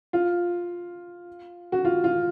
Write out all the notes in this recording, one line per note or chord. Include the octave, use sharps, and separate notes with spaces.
F4
F#4
F4
F4